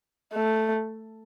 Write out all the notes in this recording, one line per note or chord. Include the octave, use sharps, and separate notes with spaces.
A3